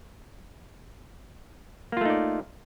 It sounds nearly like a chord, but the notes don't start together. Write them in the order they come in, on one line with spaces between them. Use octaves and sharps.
A#3 F4 A3 D#4 D5